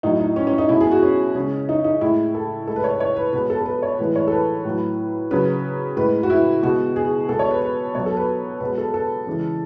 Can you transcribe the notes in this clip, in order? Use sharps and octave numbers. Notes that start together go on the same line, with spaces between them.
A2 F#3 D#4
D#4
C#4
C#4
D#4
B2 G#3 E4
G#4
F#4
C#4
C#3 G#3 C#4
D#4
D#4
A2 G#3 E4
A4
A2 G#3 A4
B4
C#5
B4
C#5
B4
B2 G#3 B4
A4
A4
B4
C#5
A2 E3 G#3 B4
C#5
A4
B4
A2 F#3
C#3 F#3 B4
A2 G#3 B4
F#4
E4
B2 G#3 F#4
G#4
B2 G#3 A4
C#5
B4
B4
B2 F#3 C#5
A4
B4
B2 G#3 B4
A4
A4
C#3 E3 G#3